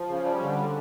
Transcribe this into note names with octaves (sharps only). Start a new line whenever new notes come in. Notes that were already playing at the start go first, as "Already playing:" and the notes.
Already playing: F3
C#3
G3
D3